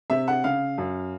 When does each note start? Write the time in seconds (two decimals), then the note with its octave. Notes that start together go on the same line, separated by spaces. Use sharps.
0.10 C3 E5
0.28 F#5
0.44 C#3 F5
0.78 F#2